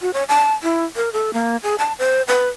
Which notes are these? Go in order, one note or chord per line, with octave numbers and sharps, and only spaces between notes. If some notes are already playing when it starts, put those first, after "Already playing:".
F#4
C#5
A5
E4
A#4
A4
A#3
G#4
A5
C5
B4